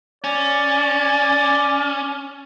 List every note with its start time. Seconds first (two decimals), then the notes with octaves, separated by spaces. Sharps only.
0.24 C#4 D5